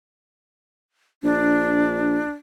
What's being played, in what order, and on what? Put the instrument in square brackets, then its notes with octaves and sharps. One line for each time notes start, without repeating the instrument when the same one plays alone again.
[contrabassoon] A#1 [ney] D4